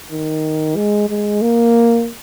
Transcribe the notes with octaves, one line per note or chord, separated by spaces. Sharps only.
D#3
G#3
G#3
A#3